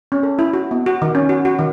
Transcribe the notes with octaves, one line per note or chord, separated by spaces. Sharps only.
C#4
A4
E4
F#4
B3
F#4
D#3
C#4
F#4
F#4
D#3